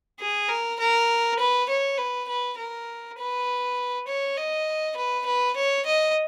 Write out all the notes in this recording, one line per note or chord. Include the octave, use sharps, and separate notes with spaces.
G#4
A#4
A#4
B4
C#5
B4
B4
A#4
B4
C#5
D#5
B4
B4
C#5
D#5